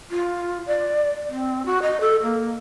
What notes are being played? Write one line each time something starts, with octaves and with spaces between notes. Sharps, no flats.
F4
D5
C4
F#4
D#5
A4
A#3